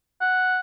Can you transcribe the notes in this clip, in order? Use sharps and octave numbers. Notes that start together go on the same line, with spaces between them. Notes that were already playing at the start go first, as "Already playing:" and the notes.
F#5